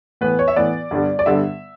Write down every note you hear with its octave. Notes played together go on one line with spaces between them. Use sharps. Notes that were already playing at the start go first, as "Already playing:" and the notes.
A2 E3 B3 B4
C#5
E5
A2 E3 B3 D5
G2 D3 G3 B3
D5
G2 D3 G3 B3 E5